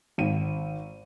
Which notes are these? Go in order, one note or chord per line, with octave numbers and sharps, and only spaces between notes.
G#1 D#7